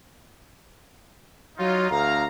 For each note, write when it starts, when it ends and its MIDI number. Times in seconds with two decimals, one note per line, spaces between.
1.58 1.89 54
1.58 1.89 63
1.58 1.89 65
1.89 2.24 38
1.89 2.24 77
1.89 2.24 82